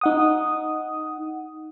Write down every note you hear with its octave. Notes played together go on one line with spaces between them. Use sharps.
D#4 F#5 D#6